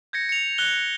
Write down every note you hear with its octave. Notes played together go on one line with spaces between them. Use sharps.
G6 G#6 A#6 C#7
C#7 F7
F#6 G7